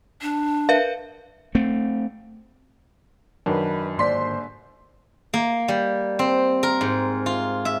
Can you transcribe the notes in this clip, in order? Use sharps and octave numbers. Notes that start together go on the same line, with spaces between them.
D4
A#4 B4 E5 F5
A3 C4
F#2 D#3 F#3 D4 A#4 B4
G1 G#2 A#3 C5 D5 C6 B6
A#3
G3
C4
A#4
G#2
F4
E5